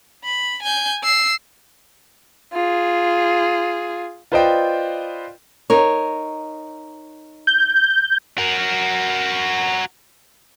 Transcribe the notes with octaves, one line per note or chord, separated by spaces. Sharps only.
B5
G#5 G6
E6 C7
F4 G#4
F4 B4 C5 D5 D#5 G5
D#4 A#4 C#5
G6
F#4 A#4